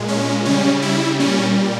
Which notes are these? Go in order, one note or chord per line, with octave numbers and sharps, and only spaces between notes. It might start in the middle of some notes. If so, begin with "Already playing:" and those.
Already playing: A#2 G#3
C#4
C#3 G3 C#4
E4
A#2 G3 C#4